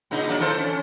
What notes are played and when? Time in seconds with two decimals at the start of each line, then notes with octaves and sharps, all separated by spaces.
0.11 A#2 C#3 D#4
0.28 F#3 A#3 D4
0.40 E3 A4 C5
0.59 C#4